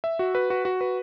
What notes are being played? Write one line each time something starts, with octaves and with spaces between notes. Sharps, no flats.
E5
F#4
B4
F#4
F#4
B4